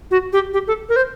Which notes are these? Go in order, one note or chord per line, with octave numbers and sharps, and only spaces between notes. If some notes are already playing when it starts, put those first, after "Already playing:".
F#4
G4
G4
A4
A#4
C5